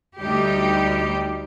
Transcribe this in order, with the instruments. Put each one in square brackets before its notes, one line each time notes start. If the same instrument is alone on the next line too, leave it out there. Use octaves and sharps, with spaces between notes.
[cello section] D2 G3 D#4 G4